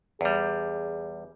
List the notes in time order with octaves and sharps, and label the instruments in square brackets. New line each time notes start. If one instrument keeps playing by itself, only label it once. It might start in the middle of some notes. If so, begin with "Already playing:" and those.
[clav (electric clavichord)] E2 G3 [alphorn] G#4